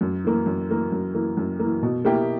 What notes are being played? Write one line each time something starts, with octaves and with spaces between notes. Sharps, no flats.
F#2
E3 A#3
F#2
E3 A#3
F#2
E3 A#3
F#2
E3 A#3
B2
A#3 E4 G4